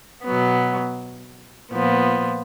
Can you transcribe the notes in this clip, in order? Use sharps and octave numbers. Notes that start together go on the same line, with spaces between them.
B2 F#3 B3
A#2 F3 B3